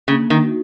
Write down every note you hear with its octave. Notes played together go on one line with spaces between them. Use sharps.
C#3 A#3
D#3
D#4 F#4